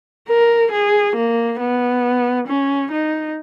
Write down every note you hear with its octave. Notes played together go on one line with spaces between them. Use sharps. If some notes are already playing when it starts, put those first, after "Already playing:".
A#4
G#4
A#3
B3
C#4
D#4